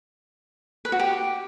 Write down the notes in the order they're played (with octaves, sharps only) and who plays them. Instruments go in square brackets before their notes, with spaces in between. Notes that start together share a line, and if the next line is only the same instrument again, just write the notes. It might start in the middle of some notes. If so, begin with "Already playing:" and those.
[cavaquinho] B4
F#4
G4